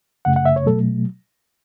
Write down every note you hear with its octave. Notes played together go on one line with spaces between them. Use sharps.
F#2 C#3 A3 F#5
F#5
E5
C#5
B2 F#3 A3 A4